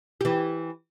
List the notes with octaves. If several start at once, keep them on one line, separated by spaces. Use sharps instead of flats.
E3 G4